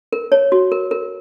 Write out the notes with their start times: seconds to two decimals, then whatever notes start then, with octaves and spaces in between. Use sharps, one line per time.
0.13 A#4
0.32 C#5
0.52 F#4
0.72 A#4
0.91 A#4